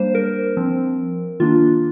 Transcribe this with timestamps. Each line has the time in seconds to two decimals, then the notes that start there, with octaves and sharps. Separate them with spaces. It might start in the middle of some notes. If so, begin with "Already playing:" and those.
Already playing: G3 A#3 D4 C5
0.15 A#4
0.57 F3 C4
1.40 D#3 A#3 D4 F4